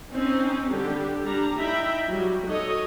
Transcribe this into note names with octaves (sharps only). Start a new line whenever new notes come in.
C4 C#4 D#4
D3 G3 D4 G4 A4
G3 D4 A#5
D#4 E4 E5 G5 A#5 B5
F#3 G3
D#4 F#4 A4 C#5 D#5